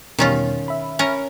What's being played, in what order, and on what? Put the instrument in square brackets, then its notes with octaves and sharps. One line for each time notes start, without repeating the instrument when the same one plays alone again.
[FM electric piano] E2 B2 G3 [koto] D#3 C#4 F4
[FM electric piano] E5 B5
[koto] C#4 A#4